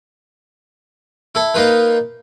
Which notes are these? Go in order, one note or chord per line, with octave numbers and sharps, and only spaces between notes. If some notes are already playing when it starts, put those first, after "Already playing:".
E4 A4
A#3 D#4 F4 B4